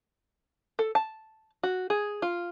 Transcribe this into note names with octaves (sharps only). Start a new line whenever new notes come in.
A4
A5
F#4
G#4
F4